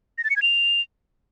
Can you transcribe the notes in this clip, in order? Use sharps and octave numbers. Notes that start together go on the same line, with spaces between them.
A#6
A6
C#7
G#6
F7